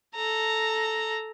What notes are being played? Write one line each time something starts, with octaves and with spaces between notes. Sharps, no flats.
A4 A#5